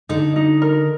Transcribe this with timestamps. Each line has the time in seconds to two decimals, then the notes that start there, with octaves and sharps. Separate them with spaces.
0.09 D3 D#4
0.36 D#4
0.62 A#4